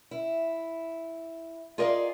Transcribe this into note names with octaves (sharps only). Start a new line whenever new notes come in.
E4
F4 G#4 A#4 D5 D#5 F5